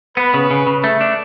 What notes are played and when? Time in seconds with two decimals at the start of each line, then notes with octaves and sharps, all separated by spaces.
0.17 B3 B4
0.34 C#3
0.51 C#3
0.67 C#3
0.84 A3
1.01 D4